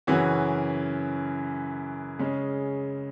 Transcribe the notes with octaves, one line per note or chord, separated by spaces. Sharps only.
F#2 C#3 E3 C#4 F#4
C#3 G#3 C#4